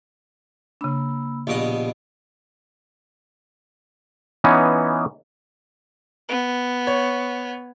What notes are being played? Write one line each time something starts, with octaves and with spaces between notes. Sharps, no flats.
C#3 A#3 D4 B5 E6
A#1 B2 B3 G4 D#5
E3 B3 C#4 D#4
B3
C#5